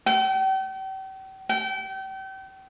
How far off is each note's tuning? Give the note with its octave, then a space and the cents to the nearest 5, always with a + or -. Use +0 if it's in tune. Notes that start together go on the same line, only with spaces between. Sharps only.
G5 -40
G5 -35